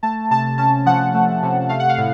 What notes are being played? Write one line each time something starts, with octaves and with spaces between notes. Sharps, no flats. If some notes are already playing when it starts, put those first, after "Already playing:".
A3 A5
C3 A5
C#4 A5
F3 F#5
A3
C3
A3 F5
F#5
F5
A2